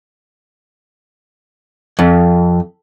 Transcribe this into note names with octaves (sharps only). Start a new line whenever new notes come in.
F2